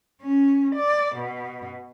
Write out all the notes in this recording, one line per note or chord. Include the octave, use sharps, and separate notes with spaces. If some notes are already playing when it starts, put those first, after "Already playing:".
C#4
D5
B2